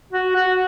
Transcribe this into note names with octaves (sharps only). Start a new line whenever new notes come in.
F#4
F#4